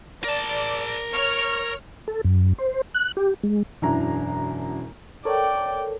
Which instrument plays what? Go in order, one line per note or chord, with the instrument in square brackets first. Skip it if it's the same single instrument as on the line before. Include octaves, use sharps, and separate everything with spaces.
[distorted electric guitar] A#4 A5 [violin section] D5
[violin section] C#5 F6
[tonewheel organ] A4
F#2
C5
F#6
G4
G#3
[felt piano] E1 F#2 D4 E4 A#5
[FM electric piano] A4 A#4 C#5 [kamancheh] D5 G5